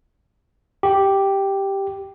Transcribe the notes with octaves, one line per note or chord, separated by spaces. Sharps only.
G4